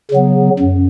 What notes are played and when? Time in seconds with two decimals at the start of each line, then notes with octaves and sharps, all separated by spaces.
0.11 C#3 F#3 B3
0.59 F#2